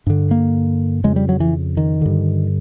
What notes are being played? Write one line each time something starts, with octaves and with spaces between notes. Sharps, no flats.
G2 D3
A#3
F2 C#3 G#3
G3
F#3
E3
D#3
G2 D3